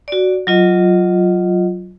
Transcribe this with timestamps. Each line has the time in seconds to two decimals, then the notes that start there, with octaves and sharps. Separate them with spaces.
0.08 F#4 D5
0.47 F#3 F4 D#5